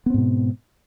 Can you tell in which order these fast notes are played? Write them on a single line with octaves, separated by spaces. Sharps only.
B3 C4 G#2 B2